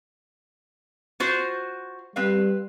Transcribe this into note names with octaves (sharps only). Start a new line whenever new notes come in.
F4 F#4 C5
G3 C4 B4 F5